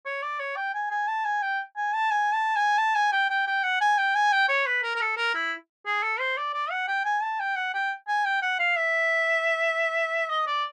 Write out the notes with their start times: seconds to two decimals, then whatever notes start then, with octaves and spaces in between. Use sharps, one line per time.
0.05 C#5
0.22 D5
0.39 C#5
0.56 G5
0.74 G#5
0.91 G#5
1.08 A5
1.25 G#5
1.42 G5
1.76 G#5
1.94 A5
2.11 G#5
2.33 A5
2.56 G#5
2.78 A5
2.95 G#5
3.12 G5
3.30 G5
3.47 G5
3.63 F#5
3.81 G#5
3.98 G5
4.15 G#5
4.32 G5
4.49 C#5
4.66 B4
4.83 A#4
4.96 A#4
5.01 A4
5.17 A#4
5.35 E4
5.86 G#4
6.03 A4
6.19 C5
6.37 D5
6.54 D5
6.71 F#5
6.88 G5
7.05 G#5
7.22 A5
7.40 G5
7.56 F#5
7.74 G5
8.08 G#5
8.25 G5
8.42 F#5
8.59 F5
8.76 E5
10.29 D#5
10.47 D5